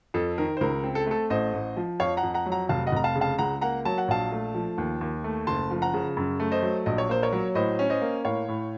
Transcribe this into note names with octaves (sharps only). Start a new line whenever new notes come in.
F2 A4
D#3 A#4
C5
C#2 A#4
C4
A4
A3 A4
A1 C5 D#5
A1
F3
F2 C#5 F5
F#5 A#5
F2
F#5 A#5
F#3
F#5 A#5
F1 F5 A5
D#5 F#5
F1 A#5
F5 A5
C#3
F5 A5
C#2 F#5 A#5
A#3 F#5 A#5
F#3 A5
F#5
A#1 F5 A5
A3
F3
D#2
D#2
A3
F#1 A5 C6
F3
F#5 A#5
C#3
F#2
A3
C5 D#5
F#3
A#1 D#5
C#5
A#3 C5
A#4 C#5
F#3
A2 C5 D#5
C#4
C5 D#5
A#3
A2 C#5 F5
A2